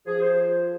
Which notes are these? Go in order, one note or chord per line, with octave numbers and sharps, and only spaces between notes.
F3 G#4
C5